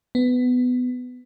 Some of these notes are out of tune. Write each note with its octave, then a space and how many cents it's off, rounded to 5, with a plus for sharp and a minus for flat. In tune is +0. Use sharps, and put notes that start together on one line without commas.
B3 +15